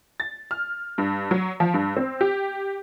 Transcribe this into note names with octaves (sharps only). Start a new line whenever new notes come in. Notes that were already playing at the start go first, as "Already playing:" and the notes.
A6
F6
G2
F#3
F3
G2
C4
G4